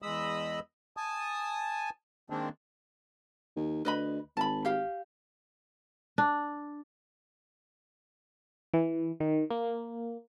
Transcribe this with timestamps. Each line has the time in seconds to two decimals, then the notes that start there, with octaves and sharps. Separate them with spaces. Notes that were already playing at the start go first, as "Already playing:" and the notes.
0.02 E2 G#3 D#5 B5 D#6 E6
0.97 G#5 A5 D#6
2.30 D#3 G#3 A#3 C4 D4
3.56 D#2
3.85 D2 B4 D#5 B5
4.37 G#1 A5 B5
4.65 G4 F5
6.18 D4
8.74 E3
9.20 D#3
9.50 A#3